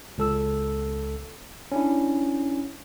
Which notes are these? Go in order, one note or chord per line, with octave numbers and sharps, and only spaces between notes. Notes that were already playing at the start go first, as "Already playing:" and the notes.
C#2 A4 E6
C#4 D4 E4